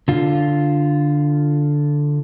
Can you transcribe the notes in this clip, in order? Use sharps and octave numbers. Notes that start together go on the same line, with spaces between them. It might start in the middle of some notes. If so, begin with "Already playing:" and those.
D3 F4